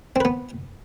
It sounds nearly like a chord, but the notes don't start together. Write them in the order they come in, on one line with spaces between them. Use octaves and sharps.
C4 B4 B3